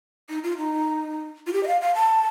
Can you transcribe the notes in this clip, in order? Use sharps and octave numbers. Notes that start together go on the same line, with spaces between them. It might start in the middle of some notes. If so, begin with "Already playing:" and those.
D#4
F4
D#4
F4
G4
D#5
F5
F5
A5